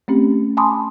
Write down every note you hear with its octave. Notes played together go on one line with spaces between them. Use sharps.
A3 C4 C#4 G4
G#5 A5 B5 C6 D6 D#6